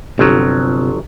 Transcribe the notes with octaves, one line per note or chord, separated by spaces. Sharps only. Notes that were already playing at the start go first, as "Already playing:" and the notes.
G1 C3 F3 F#3